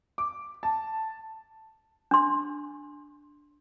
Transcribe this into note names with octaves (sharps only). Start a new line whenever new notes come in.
D6
A5
D4 C6